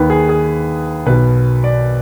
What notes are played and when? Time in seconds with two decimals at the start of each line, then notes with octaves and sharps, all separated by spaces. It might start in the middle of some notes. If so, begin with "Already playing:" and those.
Already playing: D#2 D#3 B4
0.10 G#4
0.29 G#4
1.06 B1 B2 B4
1.64 D5